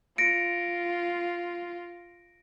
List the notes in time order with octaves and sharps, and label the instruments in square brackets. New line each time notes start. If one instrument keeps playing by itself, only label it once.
[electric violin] F4 [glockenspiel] A#6 C#7 D7